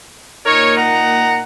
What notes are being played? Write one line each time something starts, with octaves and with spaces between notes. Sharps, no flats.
A#2 A#3 D#4 A#4 C#5
F#5 A#5